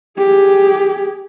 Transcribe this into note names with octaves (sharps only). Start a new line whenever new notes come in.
G4 G#4